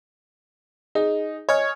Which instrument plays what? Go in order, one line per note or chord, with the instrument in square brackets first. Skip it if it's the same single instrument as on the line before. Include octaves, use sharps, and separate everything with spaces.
[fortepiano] D#4 [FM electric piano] G#4
[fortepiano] C#5 [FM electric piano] D#5 G#5 F6